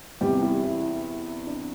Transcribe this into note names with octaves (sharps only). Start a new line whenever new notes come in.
E2 C3 E3 G3 G4
E4
E4
D4